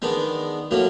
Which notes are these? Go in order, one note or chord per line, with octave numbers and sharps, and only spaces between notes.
D#3 G#3 B3 D4
A2 F#3 A#3 C#4